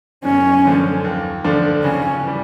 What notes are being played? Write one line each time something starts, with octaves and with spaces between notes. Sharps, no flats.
F#2 C#4
D3 F3 A3
D#2
D3 F3 A3 D4
C#3 C#4
E3 G3